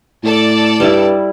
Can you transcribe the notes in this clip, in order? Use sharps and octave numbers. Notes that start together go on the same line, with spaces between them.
A2 A4 D5 A5
G2 G3 E4